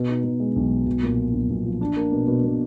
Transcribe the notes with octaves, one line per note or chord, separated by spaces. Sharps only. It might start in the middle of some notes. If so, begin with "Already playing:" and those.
Already playing: B2
D#4
B2
G#3
B1
B2
B1
A#2
F3
B1
B1
F3
D4
A#3
B2
B2
B2